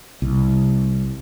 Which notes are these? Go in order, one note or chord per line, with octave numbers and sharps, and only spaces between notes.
C2